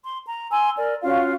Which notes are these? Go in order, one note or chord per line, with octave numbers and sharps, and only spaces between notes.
C6
A#5
G#5 C6 E6
A#4 D5
C#4 F4 F#4 F5